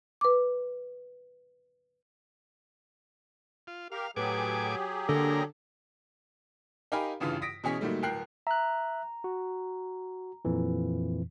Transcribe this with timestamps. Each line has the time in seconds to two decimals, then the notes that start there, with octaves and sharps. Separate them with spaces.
0.21 B4 D6
3.67 F4
3.92 G4 A#4 F5
4.16 A2 F#3 G4 G#4 B4 G#5 D6
5.09 D3 A#3 A4 A#4
6.92 D#4 G4 A#4 F5 G#5 B5
7.20 A1 G2 C#3 E3 F4
7.42 D#6 A#6 B6 D7
7.64 B2 E3 C#4 G#4 C#5 B6
7.81 A#2 D#3 F#3 G3 A3
8.03 D1 A#4 G5 F#6 C7
8.47 E5 A#5 F#6
9.24 F#4
10.45 F2 A#2 E3